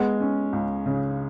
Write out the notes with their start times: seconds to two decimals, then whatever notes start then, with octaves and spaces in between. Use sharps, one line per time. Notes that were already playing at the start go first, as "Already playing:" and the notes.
Already playing: G#3 B3
0.21 C#4
0.53 C#2
0.86 C#3